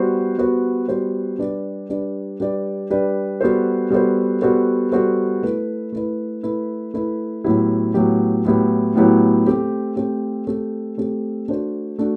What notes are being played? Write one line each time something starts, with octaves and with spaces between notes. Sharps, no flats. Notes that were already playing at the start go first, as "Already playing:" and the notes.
Already playing: G3 B3 F#4 C5
G3 B3 F#4 C5
G3 B3 F#4 C5
G3 D4 G4 B4 D5
G3 D4 G4 B4 D5
G3 D4 G4 B4 D5
G3 D4 G4 B4 D5
G3 B3 F#4 A4 C5
G3 B3 F#4 A4 C5
G3 B3 F#4 A4 C5
G3 B3 F#4 A4 C5
A3 E4 B4
A3 E4 B4
A3 E4 B4
A3 E4 B4
A2 F#3 B3 E4 G4
A2 F#3 B3 E4 G4
A2 F#3 B3 E4 G4
A2 F#3 B3 E4 G4
A3 C4 G4
A3 C4 G4
A3 C4 G4
A3 C4 G4
A3 D4 F#4 C5
A3 D4 F#4